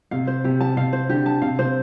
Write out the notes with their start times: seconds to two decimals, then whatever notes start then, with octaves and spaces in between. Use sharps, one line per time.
0.11 C3 F5
0.27 C5
0.44 C3 G4
0.61 A5
0.77 C3 F5
0.93 C5
1.09 D3 G4
1.26 A5
1.42 C3 F5
1.59 C3 C5